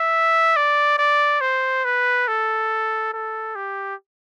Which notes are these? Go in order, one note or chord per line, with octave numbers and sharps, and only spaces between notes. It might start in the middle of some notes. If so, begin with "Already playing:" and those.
Already playing: E5
D5
D5
C5
B4
A4
A4
G4